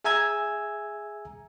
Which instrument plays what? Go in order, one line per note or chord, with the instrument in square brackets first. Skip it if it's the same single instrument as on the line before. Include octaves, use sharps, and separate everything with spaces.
[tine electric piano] G#4 E5 G#5 A#5 E6 G#6